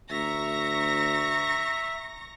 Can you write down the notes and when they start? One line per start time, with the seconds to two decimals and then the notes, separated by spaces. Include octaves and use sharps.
0.11 D2 E5 A#5 C#6 A#6